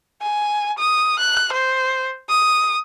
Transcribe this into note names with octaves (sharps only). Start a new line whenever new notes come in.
G#5
D#6
F#6
C5
D#6